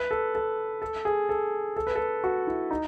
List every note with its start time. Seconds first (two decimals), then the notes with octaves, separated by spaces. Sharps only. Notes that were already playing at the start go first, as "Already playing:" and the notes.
Already playing: B4
0.11 A4
0.35 A4
0.82 A4
1.05 G#4
1.29 A4
1.77 A4
1.87 B4
1.96 A4
2.24 F#4
2.47 E4
2.71 D#4